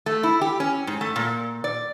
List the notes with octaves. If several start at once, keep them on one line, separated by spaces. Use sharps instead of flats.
A3
E4
G4
C#4
G#2
A3
A#2
D5